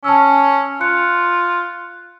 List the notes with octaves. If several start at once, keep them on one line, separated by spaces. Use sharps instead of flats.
C#4 A5 E6
F4 F#6 C#7